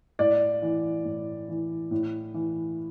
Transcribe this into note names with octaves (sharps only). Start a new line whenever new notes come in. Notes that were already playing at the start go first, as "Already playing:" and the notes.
A2 D5
E3
A2
E3
A2
E3